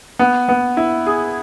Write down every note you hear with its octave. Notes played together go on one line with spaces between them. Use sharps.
B3
B3
E4
G#4